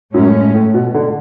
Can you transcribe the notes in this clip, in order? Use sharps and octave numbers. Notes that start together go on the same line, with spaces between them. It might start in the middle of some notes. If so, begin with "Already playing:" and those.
F#2 A2 G#3 C#4
A2
B2
D3